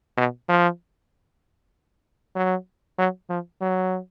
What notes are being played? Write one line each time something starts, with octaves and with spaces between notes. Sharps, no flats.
B2
F3
F#3
F#3
F3
F#3